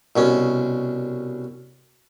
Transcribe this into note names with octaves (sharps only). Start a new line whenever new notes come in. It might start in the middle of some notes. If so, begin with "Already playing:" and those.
C2 B2 C#4